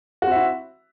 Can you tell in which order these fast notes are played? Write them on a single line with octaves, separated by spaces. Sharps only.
F#4 C4 E5 E4